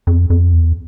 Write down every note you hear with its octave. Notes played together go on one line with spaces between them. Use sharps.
F2
F2
E2